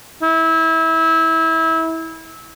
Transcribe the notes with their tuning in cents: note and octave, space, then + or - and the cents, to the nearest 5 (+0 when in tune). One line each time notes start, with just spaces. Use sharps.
E4 -25